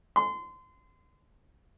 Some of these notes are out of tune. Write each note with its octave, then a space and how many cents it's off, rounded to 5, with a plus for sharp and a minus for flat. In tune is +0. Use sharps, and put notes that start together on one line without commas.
C6 -30